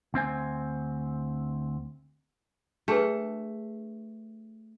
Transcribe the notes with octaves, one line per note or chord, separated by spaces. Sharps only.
D2 C4 C5 G#5
A3 D4 G#4 B4